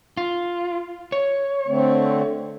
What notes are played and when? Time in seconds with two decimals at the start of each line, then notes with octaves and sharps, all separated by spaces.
0.17 F4
1.12 C#5
1.68 D3 A3 C4